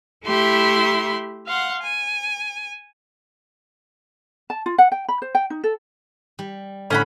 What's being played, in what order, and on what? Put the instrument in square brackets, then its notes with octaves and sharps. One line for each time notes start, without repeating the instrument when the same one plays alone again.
[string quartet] A3 E4 G4 E5 B5 C6
F5 F#5 C6
G#5
[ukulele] A5
F4
F#5
G5
B5
C5
G5
D#4
A4
[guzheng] G3
[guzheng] A2 D3 [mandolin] C#4 F#5 B5